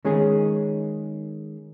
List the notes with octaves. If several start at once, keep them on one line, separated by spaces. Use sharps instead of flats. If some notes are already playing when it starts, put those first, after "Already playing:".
D#3 G#3 C#4 G#4